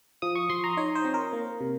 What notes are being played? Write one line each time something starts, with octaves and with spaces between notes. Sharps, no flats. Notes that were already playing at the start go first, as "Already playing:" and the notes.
F3 D#6
C#6
F3 C6
A#5
D#4 C#5
C5
C4
A#4
A#3
C3